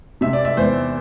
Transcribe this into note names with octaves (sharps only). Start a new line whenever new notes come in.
C3 E5
D5
E5
E2 C5